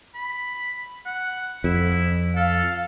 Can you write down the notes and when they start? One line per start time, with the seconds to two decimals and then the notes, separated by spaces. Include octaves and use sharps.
0.15 B5
1.06 F#5
1.64 F2 E4
2.36 A4 F5